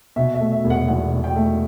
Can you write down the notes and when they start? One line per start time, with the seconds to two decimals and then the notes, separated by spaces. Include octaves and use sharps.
0.16 B2 E5
0.35 E5
0.40 A3
0.52 E5
0.64 E1
0.70 F#5
0.88 E2 F#5
1.12 B2
1.24 G5
1.36 A3